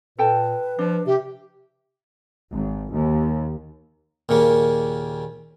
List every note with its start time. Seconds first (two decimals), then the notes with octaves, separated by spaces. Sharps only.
0.18 A#2 A4 B4 G5 A5
0.79 F3 D4
1.06 C3 G4 E5
2.52 G#1
2.93 D#2
4.29 D#2 A#2 C#3 A#3